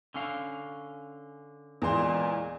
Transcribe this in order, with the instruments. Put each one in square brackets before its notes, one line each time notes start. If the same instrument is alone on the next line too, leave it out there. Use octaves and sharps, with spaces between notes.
[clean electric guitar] D3 C#4 F5
[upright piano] E2 C6 [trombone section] A#2 G#3